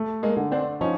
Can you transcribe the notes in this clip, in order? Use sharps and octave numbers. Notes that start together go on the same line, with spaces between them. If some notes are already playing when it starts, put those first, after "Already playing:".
Already playing: A3
G#3 A#3
D3
C4 D4
F3 C#4 D#4